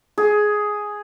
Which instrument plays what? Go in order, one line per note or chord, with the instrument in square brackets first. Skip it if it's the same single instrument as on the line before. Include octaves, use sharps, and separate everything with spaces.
[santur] G#4